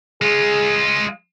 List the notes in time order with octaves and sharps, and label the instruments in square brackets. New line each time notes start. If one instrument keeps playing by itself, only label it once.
[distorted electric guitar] G#3 F4 [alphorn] G#4